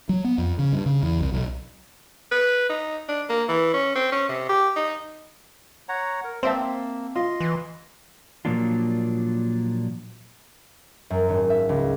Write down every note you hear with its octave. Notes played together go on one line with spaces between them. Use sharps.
F#3
B3
F2
C#3
G2
C#3
E2
C2
B1
B4
D#4
D4
A#3
E3
C#4
C4
C#4
C3
G4
D#4
C#5 F#5 A#5
A#4
A#3 C4 C5 E5 A5
F4 D#5 C6
E3
A#2 F3 F#3 A#3 D4 F4
F#2
G#1
E5
C#2